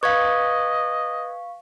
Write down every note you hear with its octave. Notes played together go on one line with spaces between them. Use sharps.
B4 D#5 F5 C#6 G#6